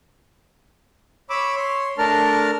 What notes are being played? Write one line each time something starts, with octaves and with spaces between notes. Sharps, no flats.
C#5 B5 D6 E6
C#5 C6
A3 D4 A#4 A5 F6